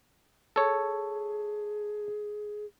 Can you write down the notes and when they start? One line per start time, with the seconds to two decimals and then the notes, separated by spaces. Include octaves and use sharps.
0.56 G#4 A4 C#5